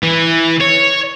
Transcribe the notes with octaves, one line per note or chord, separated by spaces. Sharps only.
E3
C#5